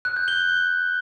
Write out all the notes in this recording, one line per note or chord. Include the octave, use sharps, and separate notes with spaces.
F#6
G6
G7